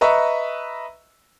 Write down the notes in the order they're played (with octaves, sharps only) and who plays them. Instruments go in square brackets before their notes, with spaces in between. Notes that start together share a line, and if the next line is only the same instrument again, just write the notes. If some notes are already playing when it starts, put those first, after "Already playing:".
[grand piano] B4 D#5 E5 A#5 C#6